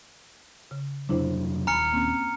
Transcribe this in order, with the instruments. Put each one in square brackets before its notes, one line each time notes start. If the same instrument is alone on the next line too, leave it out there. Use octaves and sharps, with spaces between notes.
[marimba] C#3
[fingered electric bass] F2 C3 F#3 [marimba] D4 E4 C5
[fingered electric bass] D#1 [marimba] G#5 B5 [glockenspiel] A#5 F6 C#7
[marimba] A#3 C4 C#4